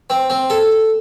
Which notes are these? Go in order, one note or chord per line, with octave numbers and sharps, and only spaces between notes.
C4
C4
A4